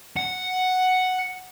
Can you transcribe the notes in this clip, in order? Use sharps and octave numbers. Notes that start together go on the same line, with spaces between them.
F#5